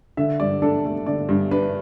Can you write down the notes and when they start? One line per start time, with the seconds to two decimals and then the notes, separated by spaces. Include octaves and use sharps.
0.17 D3 E5
0.40 G2 D5
0.62 D4 A4
0.85 A3 A4
1.06 D3 D5
1.29 G2
1.51 D4 B4